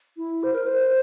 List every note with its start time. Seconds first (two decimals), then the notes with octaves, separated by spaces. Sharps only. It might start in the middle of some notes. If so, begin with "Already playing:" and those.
0.17 E4
0.43 C5
0.55 A#4
0.66 C5